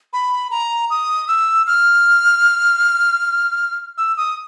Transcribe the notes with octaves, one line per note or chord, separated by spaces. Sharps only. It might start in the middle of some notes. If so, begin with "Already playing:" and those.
B5
A#5
D#6
E6
F6
E6
D#6